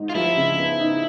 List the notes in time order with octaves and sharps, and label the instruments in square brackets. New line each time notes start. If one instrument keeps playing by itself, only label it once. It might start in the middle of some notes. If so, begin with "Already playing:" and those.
Already playing: [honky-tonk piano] G#2 D#4
[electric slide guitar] F4
[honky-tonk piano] F3 [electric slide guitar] E4
[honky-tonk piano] C#3
B3
D#4